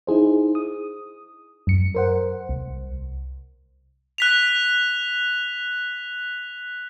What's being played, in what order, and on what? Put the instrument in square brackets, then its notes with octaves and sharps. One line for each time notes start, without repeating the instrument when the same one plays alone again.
[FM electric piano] D#4 E4 G#4 C5
D#6
F#2 C#7
A#4 C5 F#5
C2
[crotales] F#6 B6 F7